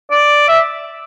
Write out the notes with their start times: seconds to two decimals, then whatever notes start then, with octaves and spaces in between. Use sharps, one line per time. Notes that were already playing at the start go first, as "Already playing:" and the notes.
0.11 D5
0.48 E5